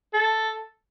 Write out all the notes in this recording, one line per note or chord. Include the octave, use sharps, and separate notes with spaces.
A4